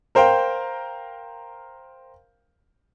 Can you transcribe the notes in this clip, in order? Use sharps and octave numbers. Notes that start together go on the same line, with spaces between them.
A#4 C5 F5 G5